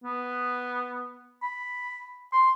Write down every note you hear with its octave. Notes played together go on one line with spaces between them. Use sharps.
B3
B5
C6